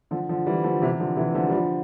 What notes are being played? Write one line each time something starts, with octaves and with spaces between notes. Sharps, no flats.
D3 F3
D3 F3
E3 G3
D3 F3
C3 E3
D3 F3
C3 E3
D3 F3
G3
D3 F3